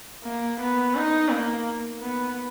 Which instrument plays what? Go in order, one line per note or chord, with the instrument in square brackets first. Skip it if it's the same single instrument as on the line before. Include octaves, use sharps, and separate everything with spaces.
[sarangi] A#3
B3
D#4
A#3
B3